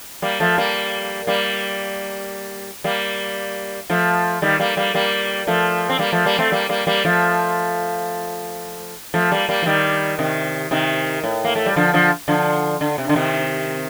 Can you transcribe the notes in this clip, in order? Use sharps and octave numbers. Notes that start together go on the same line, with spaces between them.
G3 A#3
F3 A3
G3 A#3
G3 A#3
G3 A#3
F3 A3
D#3 G3
G3 A#3
G3 A#3
G3 A#3
F3 A3
C4
G3 A#3
F3 A3
G3 A#3
A3 C4
G3 A#3
G3 A#3
G3 A#3
F3 A3
F3 A3
G3 A#3
G3 A#3
F3
D#3 G3
C3 D#3
C3 D#3
A2
A#3
A3
G3
D3 F3
D3 F3
D3 F3
D3
C3
D3
C3 D#3